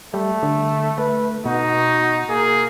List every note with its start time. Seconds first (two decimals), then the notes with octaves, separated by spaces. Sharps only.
0.14 G3 A3
0.43 D3
0.98 A3 B4
1.45 B2 D#4 F#4
2.29 A#3 G#4